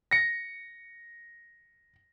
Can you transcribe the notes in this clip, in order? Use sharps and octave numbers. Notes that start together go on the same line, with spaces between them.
A#6 C#7